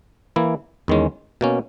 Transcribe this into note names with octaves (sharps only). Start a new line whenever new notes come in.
E3 A#3 E4
E2 D#3 G#3 C#4
B2 A#3 C#4